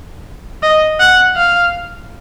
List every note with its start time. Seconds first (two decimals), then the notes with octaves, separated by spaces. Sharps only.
0.63 D#5
1.00 F#5
1.37 F5